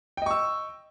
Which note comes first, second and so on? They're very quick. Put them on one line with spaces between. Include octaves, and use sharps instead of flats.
G5 D#5 C#6 E6